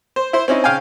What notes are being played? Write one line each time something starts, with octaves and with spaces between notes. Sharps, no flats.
C5
E4 C5
C4 C#4 D#4 E4
C#3 F5 G5 G#5